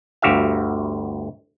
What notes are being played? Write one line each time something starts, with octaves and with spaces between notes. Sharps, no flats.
G1 D2 F#4 G4 E5 F5